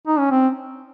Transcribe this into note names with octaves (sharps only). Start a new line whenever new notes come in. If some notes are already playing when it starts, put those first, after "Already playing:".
D#4
C#4
C4